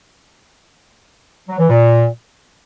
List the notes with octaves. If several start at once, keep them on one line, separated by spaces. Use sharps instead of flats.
F#3
E3
A#2